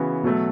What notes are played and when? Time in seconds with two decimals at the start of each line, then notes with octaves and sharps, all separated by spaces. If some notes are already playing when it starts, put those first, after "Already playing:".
Already playing: C#3 E3 B3 F#4
0.23 B2 F#3 A3